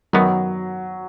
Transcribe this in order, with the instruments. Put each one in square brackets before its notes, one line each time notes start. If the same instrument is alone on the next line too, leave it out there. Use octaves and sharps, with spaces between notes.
[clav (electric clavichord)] F#2 D#3 B3 [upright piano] F#3